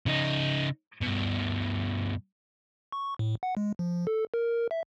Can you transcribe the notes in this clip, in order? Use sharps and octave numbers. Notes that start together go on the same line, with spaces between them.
C#3 D#4
G2 B2
C#6
A2
F#5
G#3
F3
A4
A#4
E5